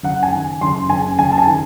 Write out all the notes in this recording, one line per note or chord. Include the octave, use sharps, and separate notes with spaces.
F#1 F#5
G#5
D#3
F#1 C6
F#1 G#5
F#1 G#5
A5
G#5
D#3